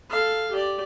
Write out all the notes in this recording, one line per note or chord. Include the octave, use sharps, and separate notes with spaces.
A4 F5
G4 D5